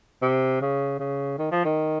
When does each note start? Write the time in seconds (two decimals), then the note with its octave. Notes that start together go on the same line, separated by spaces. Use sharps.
0.22 C3
0.61 C#3
0.99 C#3
1.38 D#3
1.51 F3
1.65 D#3